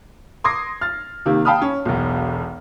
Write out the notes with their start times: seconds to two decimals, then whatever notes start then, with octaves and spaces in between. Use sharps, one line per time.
0.44 C6 D6 D#6 G#6 A#6 C7
0.81 F6 A6
1.26 C3 D#3 A#3
1.45 F5 G5 A5 B5 D#6 F6
1.62 C#4
1.85 E1 B1